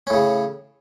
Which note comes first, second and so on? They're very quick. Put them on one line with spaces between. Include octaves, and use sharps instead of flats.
C#4 A2 C#3